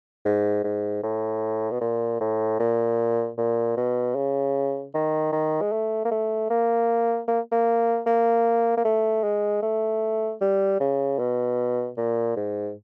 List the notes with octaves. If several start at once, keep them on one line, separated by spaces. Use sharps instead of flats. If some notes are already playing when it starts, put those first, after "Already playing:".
G#2
G#2
A2
B2
A#2
A2
A#2
A#2
B2
C#3
D#3
D#3
G#3
A3
A#3
A3
A#3
A#3
A#3
A#3
A#3
A3
G#3
A3
G3
C#3
B2
A#2
G#2